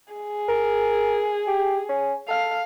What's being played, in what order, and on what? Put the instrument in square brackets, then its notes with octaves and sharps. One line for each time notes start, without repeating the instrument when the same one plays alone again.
[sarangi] G#4
[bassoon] A#4
G4
C#4
[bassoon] A4 [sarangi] F5